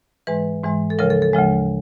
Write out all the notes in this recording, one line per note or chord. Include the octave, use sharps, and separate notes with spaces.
G#2 E3 G#3 B4
G#2 E3 G#3
A4
D2 C#3 F3 G#3 A#4
A4
A4
D2 C#3 F3 G#3